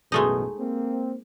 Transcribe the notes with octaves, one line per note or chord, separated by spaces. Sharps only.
A1 F#2 B2 G#3 A3 D#4
A#3 C4